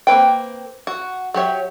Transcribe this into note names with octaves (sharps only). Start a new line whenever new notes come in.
A#3 C4 B4 G5
F#4
F#3 G4 C#5 E5